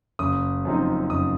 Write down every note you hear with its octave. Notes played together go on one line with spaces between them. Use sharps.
F#1 D#6
F#2 F3 C4 D#4
F#1 D#6